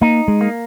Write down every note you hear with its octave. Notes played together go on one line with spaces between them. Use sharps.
A#3 D#4
G#3
A#3